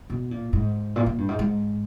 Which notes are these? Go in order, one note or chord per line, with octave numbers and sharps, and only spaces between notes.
B2
A#2
G#2
A#2
A#2
G2
G#2
G#2